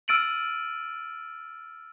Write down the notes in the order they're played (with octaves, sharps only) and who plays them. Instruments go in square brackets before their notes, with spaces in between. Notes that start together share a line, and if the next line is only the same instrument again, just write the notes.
[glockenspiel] E6 F6 A6 D7 D#7 F#7